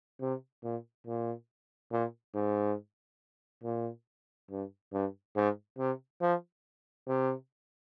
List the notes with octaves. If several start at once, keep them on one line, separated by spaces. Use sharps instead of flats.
C3
A#2
A#2
A#2
G#2
A#2
G2
G2
G#2
C3
F3
C3